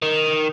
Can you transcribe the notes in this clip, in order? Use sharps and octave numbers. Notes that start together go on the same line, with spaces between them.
D#3